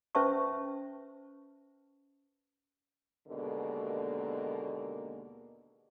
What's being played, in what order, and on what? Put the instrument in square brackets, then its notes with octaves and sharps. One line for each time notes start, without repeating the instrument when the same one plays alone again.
[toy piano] C#4 B4 C5 E5 A5 C#6
[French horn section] D#2 B2 D3 G#3 A#3